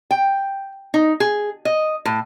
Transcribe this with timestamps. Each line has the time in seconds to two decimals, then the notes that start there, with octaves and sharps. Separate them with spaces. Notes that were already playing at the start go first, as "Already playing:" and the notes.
0.11 G5
0.94 D#4
1.20 G#4
1.65 D#5
2.05 A2